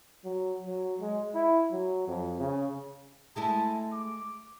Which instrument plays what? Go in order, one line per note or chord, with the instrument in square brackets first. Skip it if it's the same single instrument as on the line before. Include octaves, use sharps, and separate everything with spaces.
[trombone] F#3
F#3
G#3
E4
F#3
F2
C#3
[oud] G#3 A3 E4 [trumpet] A5
[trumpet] D6